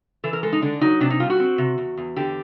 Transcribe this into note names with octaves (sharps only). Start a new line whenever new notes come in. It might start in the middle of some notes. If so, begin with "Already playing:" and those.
E3 A4
A#4
G#3 A4
D#4
D3 D4
F#3 D#4
C3 D4
D#4
G3 F4
F#4
C4
C3
E2
E2
D3 G4